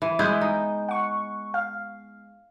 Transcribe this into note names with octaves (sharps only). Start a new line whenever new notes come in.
E3
G#3 B3 E4 G6
D#4
F#5 C#6
F5